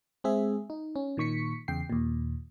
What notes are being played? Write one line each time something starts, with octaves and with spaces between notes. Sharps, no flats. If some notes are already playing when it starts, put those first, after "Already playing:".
G#3 C4 G#4 E5
D#4
C#4
A#2 D#3 C#6 B6 C#7
E2 C#3 G5 C7
D#2 A#2